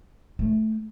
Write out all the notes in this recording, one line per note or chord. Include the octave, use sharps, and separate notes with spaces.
A3